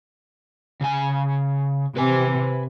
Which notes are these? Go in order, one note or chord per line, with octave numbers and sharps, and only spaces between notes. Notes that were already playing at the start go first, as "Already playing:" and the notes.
C#3 G#5
C3 B4 G#5